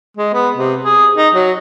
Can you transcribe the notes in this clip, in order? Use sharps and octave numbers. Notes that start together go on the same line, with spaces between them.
G#3
B3
C3
G#4
D#4
F#3